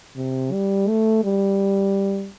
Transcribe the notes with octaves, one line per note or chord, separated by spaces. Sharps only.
C3
G3
A3
G3